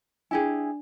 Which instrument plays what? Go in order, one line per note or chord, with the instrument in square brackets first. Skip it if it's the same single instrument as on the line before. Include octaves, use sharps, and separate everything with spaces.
[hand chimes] D4 G#5 [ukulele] E4 G4 G#4